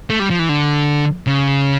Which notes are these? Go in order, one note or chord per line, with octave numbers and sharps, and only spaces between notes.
A3
G3
F3
E3
D3
C#3